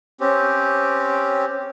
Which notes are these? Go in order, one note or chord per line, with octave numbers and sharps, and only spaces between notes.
C4 C#4 G4